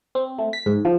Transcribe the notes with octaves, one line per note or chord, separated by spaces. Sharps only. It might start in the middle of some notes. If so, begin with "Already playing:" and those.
C4
A3
B6
G#2
F3